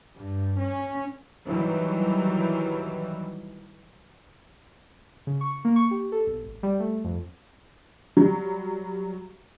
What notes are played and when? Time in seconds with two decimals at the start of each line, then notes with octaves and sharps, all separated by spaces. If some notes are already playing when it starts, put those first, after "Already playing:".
0.17 G2
0.59 C#4
1.47 D#3 E3 F#3 G3
5.27 C#3
5.41 C#6
5.65 A#3
5.76 C#6
5.91 G4
6.12 A4
6.27 B1
6.43 G#1
6.63 G3
6.80 A3
7.04 F2
8.17 F#3 G3